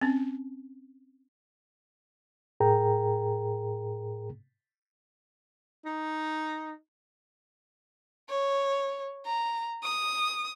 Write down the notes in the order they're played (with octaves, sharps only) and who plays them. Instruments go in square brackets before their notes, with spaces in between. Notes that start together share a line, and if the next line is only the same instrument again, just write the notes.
[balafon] C4 C#4
[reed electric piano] A2 G#4 A#4 G5 A#5
[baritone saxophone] D#4
[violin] C#5
A#5
D#6